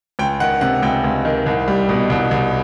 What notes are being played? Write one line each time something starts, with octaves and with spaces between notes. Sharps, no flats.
C#2 G5
D#3 F#5
C3 F#5
C#2 G5
C#2
D#3
C2
G3
B2
C2
C2